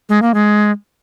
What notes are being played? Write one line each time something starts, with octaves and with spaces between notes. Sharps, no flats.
G#3
A#3
G#3